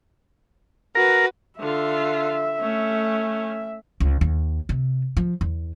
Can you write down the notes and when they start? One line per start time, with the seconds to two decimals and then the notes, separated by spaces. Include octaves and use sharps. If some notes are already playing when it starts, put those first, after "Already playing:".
0.95 F#4 A#4 B4
1.59 D3 F4 E5
2.61 A3 C#4
4.00 C#2
4.21 D#2
4.69 C3
5.17 F3
5.41 E2